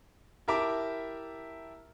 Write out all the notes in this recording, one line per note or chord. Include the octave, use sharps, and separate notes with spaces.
E4 G4 A#4 E5 A5 D6